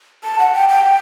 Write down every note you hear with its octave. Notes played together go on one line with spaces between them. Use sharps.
A5
F#5
G5
G5